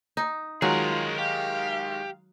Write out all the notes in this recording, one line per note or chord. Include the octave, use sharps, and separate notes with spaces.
D#4
D#3 F#3 G#3 F4 F#4 G#4 A#4
G4 F5